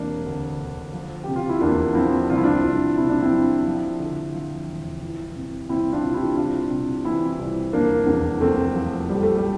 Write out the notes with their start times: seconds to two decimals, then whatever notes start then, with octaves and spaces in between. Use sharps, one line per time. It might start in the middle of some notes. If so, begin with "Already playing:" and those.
Already playing: E1 C3 A#3 D4
0.26 D2
0.60 D2
0.93 F3
1.24 C3 G4
1.36 F4
1.49 E4
1.61 E2 A#3 D4
1.95 F3 C4 E4
2.30 C2 F4
2.37 E4
2.44 D4 F4
2.64 C2
2.97 C3 E4
3.09 D4
3.22 C4 E4
3.31 F3
3.66 F3
3.99 D3
4.34 F3
4.67 E1
5.01 E3
5.35 C3
5.69 C2 C4 E4
5.92 D4 F4
6.03 C3
6.14 E4 G4
6.37 C2 D4 F4
6.71 C3
7.05 E3 C4 E4
7.39 C2
7.73 F1 A#3 D4
8.07 E2
8.41 F1 A3 C4
8.75 F3
9.09 A#1 G3
9.23 A3
9.37 G3